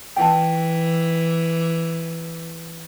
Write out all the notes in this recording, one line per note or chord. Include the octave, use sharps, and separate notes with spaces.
E3 G5 A5